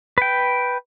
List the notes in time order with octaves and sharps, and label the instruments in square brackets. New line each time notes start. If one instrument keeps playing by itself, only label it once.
[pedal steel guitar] B4 G5